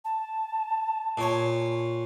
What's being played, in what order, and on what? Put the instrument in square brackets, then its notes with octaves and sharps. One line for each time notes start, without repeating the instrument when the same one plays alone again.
[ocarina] A5
[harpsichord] A#2 C#5